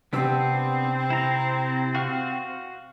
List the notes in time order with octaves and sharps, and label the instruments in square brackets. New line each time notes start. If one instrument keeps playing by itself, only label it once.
[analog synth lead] C3 [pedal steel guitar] B3 D4 E6 [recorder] C4
[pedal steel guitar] E4 A#5
F#4 F5 C#6